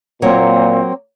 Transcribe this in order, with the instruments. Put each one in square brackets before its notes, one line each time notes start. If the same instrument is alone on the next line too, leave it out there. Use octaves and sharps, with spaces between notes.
[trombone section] A#2 [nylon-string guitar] F#3 A#3 C#5 [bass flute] C4